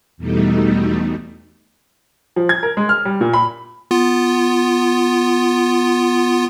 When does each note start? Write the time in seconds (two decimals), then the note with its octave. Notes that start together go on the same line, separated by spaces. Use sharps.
0.17 E2 B2 G3 A3 D#4
2.36 F3
2.49 G#6
2.63 A#4
2.77 G#3
2.89 F6
3.05 G3
3.21 A#2
3.33 B5
3.91 B3 F4